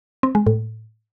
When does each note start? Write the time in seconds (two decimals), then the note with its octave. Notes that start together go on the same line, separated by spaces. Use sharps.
0.23 C4
0.35 G#3
0.47 A2